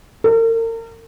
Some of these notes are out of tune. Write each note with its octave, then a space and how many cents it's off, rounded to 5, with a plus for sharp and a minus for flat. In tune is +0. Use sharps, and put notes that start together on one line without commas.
A#4 -40